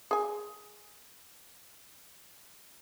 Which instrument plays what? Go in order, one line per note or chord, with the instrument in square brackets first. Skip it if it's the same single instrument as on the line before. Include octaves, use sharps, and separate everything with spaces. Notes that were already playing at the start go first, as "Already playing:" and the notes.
[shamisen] G#4 G#5